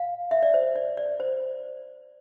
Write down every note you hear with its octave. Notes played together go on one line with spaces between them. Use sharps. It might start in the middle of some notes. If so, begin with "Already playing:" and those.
Already playing: F5
E5
D5
C5
D5
D5
C5